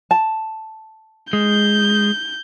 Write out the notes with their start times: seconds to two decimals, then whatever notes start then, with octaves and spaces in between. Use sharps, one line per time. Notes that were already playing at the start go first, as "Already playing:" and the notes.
0.11 A5
1.33 G#3 G6